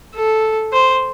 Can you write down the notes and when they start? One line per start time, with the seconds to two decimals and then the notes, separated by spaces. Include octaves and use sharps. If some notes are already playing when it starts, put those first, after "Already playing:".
0.15 A4
0.73 C5